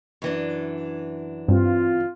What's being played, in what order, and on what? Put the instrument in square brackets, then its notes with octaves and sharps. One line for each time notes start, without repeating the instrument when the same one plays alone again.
[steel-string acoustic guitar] F#2 E3 D4
[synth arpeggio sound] G2 [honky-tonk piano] C4 [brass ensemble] F4